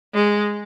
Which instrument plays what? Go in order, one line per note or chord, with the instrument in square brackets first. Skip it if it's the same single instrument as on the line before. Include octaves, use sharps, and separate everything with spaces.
[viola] G#3